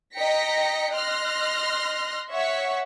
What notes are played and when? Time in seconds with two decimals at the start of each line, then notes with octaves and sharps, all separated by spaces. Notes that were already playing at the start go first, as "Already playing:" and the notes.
0.16 D#5 G5 A#5 A#6 B6 C#7
0.93 D#5 C6 F6 F#6 A#6
2.31 C#5 E5 F#5 C#6 B6